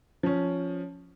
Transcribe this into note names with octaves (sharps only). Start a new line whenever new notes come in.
F3 C#4